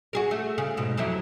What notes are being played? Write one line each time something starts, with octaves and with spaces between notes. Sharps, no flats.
F#4 G#4 A#4
A3
C#3
G#2 B2
F2 F#3 E4